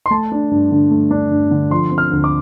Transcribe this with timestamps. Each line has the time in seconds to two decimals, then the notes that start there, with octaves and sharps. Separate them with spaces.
0.06 C6
0.11 A3 A5
0.32 D4
0.51 G2
0.71 D3
0.91 A3
1.11 D4
1.31 G2
1.51 D3
1.70 F3 C6
1.91 C4
1.98 F6
2.11 D2
2.24 D6